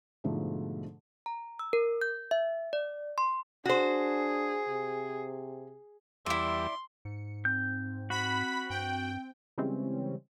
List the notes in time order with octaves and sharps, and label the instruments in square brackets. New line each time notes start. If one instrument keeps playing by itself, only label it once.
[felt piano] G#2 B2 D3 F3 A3
[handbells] A#5
E6
A#4
G6
E5
D5
C6
[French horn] D4 [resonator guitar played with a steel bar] F#4 C5 [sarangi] G#4
[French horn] C3
[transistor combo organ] E2 G3 [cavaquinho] E4 D5 [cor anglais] E5 [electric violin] C6
[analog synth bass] G#2 [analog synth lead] C#7
[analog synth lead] C4 [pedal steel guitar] G6
[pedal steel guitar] F#4 [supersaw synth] B5 B6
[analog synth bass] G2 [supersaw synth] G5
[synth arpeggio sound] C#3 E3 G3 G#3 C4 C#4